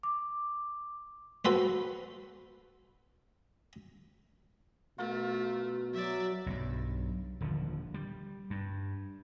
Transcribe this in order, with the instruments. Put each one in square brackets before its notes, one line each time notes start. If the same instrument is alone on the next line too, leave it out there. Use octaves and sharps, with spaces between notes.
[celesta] D6
[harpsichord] F#4 A4 B4 C5
[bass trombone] B2 [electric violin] A3 [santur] F4 A#4
[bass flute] F#3 [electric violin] D5 E5
[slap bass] B1 G2
D#1 D3 F3
G3
G2